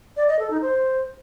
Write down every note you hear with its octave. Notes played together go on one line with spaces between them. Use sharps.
D5
D#5
A4
D#4
C5